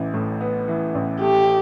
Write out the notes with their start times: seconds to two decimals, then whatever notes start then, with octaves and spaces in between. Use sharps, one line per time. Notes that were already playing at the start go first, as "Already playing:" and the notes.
Already playing: A1 E3
0.14 A2
0.41 B3
0.68 E3
0.95 A1
1.21 A3 G4